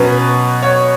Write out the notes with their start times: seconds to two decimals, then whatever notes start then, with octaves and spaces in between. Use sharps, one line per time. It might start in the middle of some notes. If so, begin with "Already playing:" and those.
Already playing: B2 F#3 C#4 B4
0.63 C#5